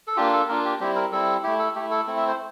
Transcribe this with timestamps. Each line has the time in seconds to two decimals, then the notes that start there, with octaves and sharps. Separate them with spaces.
0.07 A4
0.16 A#3 D4 F4 G4
0.33 A4
0.48 A#3 D4 F4 A#4
0.65 G4
0.80 G3 C4 E4 G4
0.96 A#4
1.12 G3 C4 E4 A4
1.43 A3 E4 G4
1.59 A4
1.75 A3 E4 G4
1.91 A4
2.07 A3 C4 E4
2.17 E5
2.28 C5